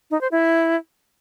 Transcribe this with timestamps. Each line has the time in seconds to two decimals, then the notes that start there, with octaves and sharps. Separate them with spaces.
0.11 D#4
0.21 C5
0.32 E4